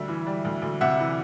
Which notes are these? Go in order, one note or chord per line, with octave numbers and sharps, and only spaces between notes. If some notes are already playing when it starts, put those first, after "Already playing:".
Already playing: D2 G3 E5
E3
G3
D2
D2
C3 E5 F#5
E3